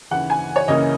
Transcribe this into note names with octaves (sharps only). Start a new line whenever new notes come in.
D#2 C#3 E3 F#5
G#5
C#5
C#2 C#3 E3 A#3 C#4 D#5